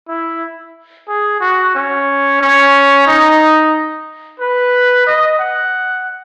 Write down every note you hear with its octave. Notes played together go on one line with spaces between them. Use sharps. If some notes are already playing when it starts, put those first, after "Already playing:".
E4
G#4
F#4
C#4
C#4
D#4
B4
D#5
F#5